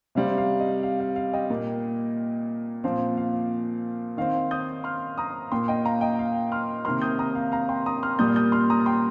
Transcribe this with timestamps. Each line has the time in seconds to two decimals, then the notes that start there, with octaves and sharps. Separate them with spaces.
0.15 C3 G3 C4 F5
0.38 F5
0.60 D#5
0.83 F5
1.00 F5
1.16 F5
1.33 D#5 G5
1.50 A#2 A#3
2.84 A#2 F3 C4 F5
3.17 F5
4.17 D#3 C4 F5
4.51 D#6 G6
4.84 C6 F6
5.18 A#5 D#6
5.52 A#2 A#3 G5 C6
5.68 D#5 G5
5.85 F5 A#5
6.01 D#5 G5
6.19 F5
6.52 C6 F6
6.85 C3 D#3 A#3 C6 F6
7.02 D#6 G6
7.19 A#5 D#6
7.35 F5
7.52 F5 A#5
7.69 G5 C6
7.86 A#5 D#6
8.03 C6 F6
8.19 A#2 G3 A#3 D#6 G6
8.36 D#6 G6
8.52 C6 F6
8.70 A#5 D#6
8.86 G5 C6